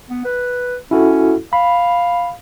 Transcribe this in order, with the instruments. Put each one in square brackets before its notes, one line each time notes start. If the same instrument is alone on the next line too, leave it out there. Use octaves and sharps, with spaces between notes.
[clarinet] B3
B4
[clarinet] C#4 [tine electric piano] E4 F#4 A4
[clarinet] F5 [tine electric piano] B5